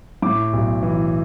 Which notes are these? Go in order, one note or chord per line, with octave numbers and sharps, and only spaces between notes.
A2 D6
B1
E3